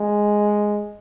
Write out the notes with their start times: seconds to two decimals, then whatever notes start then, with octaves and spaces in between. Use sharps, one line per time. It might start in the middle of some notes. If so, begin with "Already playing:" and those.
Already playing: G#3